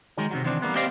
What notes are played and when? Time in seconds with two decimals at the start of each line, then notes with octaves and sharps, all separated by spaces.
0.18 D#3 F#3 G#3
0.31 C3 D#3 F#3
0.44 D#3 E3 C4 D4
0.62 G3 A#3 B3
0.75 C4 G4 C5 D5 D#5 F5